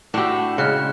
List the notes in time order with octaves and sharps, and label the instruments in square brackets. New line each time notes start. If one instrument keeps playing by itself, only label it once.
[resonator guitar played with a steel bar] A2 [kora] D4 G4 [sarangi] F#4 [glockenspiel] E7
[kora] C#3 [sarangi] G#3 [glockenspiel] F6 F#6 C#7